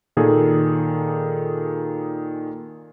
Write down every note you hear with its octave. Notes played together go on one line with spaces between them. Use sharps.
A#2 D#3 G#4 A4